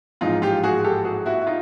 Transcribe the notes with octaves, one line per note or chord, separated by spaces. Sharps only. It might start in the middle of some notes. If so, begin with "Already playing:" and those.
A1 G#2 F3 G#3 D#4 F4
F4 G4
F#4 G#4
G4 A4
F#4 G#4
E4 F#4
E4
D#4 F4